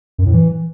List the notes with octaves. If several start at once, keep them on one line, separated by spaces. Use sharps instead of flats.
F#2
A2
E3